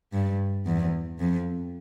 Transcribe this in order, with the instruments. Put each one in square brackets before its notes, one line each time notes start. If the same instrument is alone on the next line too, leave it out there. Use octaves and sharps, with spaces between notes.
[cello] G2
E2
F2